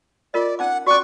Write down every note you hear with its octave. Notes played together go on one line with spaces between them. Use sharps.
F4 A#4 D5 D#5
C#4 D#4 F#5 D6
C#4 F#4 D5 C#6